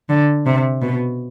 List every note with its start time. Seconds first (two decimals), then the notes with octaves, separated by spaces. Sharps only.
0.10 D3
0.46 C3
0.82 B2